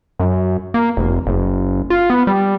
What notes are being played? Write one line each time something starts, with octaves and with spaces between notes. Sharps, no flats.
F#2
A#3
F1
F#1
F4
B3
G3